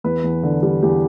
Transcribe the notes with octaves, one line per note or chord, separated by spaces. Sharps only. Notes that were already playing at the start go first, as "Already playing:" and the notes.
E2 B4
E2
D3
G3
E2 G4